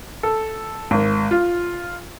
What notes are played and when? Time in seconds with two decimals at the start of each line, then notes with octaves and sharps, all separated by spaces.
0.23 A4
0.91 G#1
1.31 F4